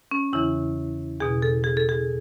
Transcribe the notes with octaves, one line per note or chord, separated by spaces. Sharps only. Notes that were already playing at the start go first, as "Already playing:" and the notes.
C#4
E2 C#3 E3 E4
E2 B2 G#4
A4
G#4
A4
G#4